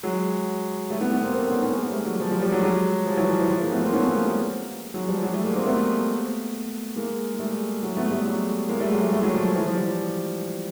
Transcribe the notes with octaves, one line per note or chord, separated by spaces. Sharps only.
F#3 G#3
G3 A3
A3 B3
A3 B3
A#3 C4
A#3 C4
B3 C#4
B3 C#4
G#3 A#3
G3 A3
F#3 G#3
F3
F3 G3
F3 G3
F#3 G#3
F#3 G#3
F3
G3
E3 F#3
F3
E3
F3
G#3 A#3
A3 B3
A#3 C4
B3 C#4
A3 B3
G#3 A#3
G3 A3
F#3 G#3
F3 G3
F#3 G#3
G3 A3
G#3 A#3
A#3 C4
A3 B3
G#3 A#3
G#3
G3 A3
F#3 G#3
A3 B3
G3 A3
F#3 G#3
G#3 A#3
G3 A3
F#3 G#3
G3 A3
G3 A3
F#3 G#3
F3
F3
E3
F3
F3 G3